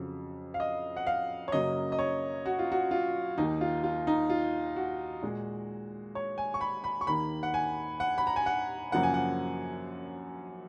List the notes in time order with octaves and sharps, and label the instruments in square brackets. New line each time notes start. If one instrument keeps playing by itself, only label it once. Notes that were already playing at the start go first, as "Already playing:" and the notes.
Already playing: [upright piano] F2 C#3 F#3
F5
D#5
F#5
F5
C#5
F#2 C#3 F#3 A#3 D#5
D#5
C#5
F#4
F4
F#4
F4
D#2 D#3 A#3 D#4
F4
F4
D#4
F4
F#4
A#2 G#3
C#5
G#5
C#6
B5
B5
C#6
D#2 D#3 A#3 B5
F#5
G#5
F#5
B5
A#5
G#5
F#5
F#2 C#3 F3 A#3 F#5
G#5
F#5